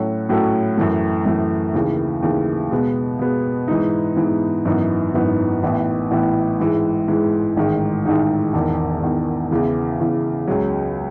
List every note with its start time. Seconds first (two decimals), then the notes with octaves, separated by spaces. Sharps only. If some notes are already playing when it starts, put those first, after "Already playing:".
Already playing: A2 F#3 C#4 F#4 A4
0.29 A2 F#3 C#4 F#4 A4
0.77 F#2 E3 A3
1.25 F#2 E3 A3
1.74 D#2 C#3 E3
2.22 D#2 C#3 E3
2.71 B2 G#3 B3
3.19 B2 G#3 B3
3.68 G#2 E3 B3 D#4
4.16 G#2 E3 B3 D#4
4.65 G#1 F#2 E3 B3 D#4
5.14 G#1 F#2 E3 B3 D#4
5.63 A1 A2 E3 B3
6.11 A1 A2 E3 B3
6.60 G#2 E3 G#3
7.08 G#2 E3 G#3
7.57 A1 G#2 D#3 G#3 D#4
8.05 A1 G#2 D#3 G#3 D#4
8.53 E1 E2 D#3
9.02 E1 E2 D#3
9.51 E2 C#3 E3
10.00 E2 C#3 E3
10.48 C#2 C#3 F#3